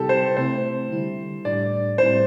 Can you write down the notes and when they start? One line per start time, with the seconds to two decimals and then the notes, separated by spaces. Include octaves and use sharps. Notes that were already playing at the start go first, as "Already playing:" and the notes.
Already playing: C3 G3 C4 E4 G4 A4
0.09 C5
0.37 C3 A3 C4 E4 C5
0.90 D3 G3 E4
1.45 A2 G3 D4 D5
1.98 A2 G3 C4 E4 C5